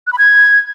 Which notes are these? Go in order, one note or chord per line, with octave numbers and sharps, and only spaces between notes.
F#6
B5
G#6